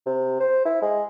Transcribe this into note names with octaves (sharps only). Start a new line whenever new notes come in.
C3
C5
E4
G#3